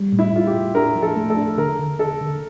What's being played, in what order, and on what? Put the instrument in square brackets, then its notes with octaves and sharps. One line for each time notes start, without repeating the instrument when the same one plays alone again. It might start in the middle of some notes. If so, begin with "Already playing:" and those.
Already playing: [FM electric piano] G3
A2
[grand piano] E4
[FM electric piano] A2 [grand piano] F4
[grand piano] G4
[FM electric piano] A2
[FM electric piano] D4 [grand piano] A#4
[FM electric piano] F3
[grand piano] A4
[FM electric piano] A3
[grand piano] A4
[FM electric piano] D4
[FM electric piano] D3 [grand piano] A#4
[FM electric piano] D3
[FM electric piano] D3 [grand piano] A4
[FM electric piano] D3